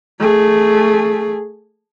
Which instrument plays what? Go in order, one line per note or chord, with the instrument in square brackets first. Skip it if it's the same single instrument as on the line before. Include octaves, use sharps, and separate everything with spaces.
[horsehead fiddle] A3 G#4